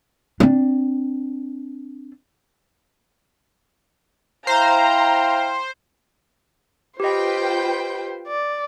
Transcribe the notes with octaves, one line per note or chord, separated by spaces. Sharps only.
C4 D4
E4 C5 F5 G5 A#5
F4 G4 B4 C5 D#5 G5
D5